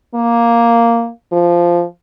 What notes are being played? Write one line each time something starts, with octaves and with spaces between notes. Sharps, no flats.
A#3
F3